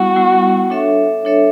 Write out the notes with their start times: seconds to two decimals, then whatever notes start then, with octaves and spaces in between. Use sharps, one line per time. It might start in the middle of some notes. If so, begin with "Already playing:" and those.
Already playing: G3 B3 E4 F#4
0.16 G3 B3 E4
0.70 D4 A4 C#5 E5
1.25 D4 A4 C#5 E5